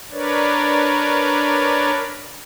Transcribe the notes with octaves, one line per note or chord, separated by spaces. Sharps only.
D4 A#4 B4 C#5 D5